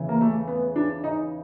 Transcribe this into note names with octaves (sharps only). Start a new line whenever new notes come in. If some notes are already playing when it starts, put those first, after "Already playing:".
Already playing: E2 C#3 E3
A#3
A3
B3
D4
D#4